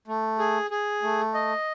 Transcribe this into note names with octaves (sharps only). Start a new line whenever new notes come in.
A3
G#4
G#4
A3
D#5